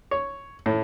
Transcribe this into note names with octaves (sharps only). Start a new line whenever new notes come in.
C#5
A2